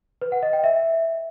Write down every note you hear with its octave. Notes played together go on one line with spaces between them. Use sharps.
B4
F#5
D#5
G5
E5